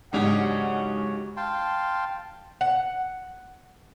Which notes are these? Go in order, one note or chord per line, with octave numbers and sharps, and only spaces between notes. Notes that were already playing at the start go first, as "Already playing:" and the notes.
G#2 C#3 F#3 D4 G4 D#5 F#5
F5 G5 A5 C6
F#5